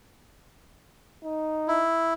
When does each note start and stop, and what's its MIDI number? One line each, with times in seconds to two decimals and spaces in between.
1.24 1.82 63
1.68 2.14 64